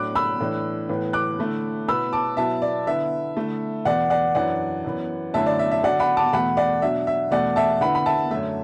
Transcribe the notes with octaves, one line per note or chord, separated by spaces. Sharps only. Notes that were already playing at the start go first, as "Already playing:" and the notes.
Already playing: A2 F#3 D4 D6 F#6
B5 E6
A2 E3 D4
A2 E3 B3
D6 F#6
D3 A3 E4
B2 B3 E4 B5 E6
A5 D6
B2 F#3 B3 E4 E5 A5
D5
D3 B3 E4 E5
D3 A3 E4
E2 B2 B3 D5 F#5
D5 F#5
F#2 E3 D4 D5 F#5
F#2 E3 B3
F#2 D3 A3 E4 E5 A5
D5
E5
E5
D3 F#3 D4 D5 F#5
F#5 B5
A5 D6
E2 B2 A3 F#5 B5
D5 F#5
B2 F#3 D4 E5
E5
E2 B2 A3 D5 F#5
E5 A5
D3 B3 E4 F#5 B5
B5
E5 A5
F#2 D3 A3 E5